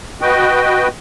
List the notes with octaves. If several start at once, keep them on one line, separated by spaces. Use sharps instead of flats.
F#4 B4 D#5 G5